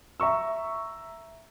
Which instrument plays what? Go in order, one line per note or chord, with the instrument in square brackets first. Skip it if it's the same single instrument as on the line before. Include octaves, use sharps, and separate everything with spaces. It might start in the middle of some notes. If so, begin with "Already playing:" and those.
[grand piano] E5 A#5 C#6 E6